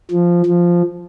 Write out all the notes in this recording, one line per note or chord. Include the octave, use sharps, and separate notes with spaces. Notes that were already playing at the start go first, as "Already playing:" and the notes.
F3
F3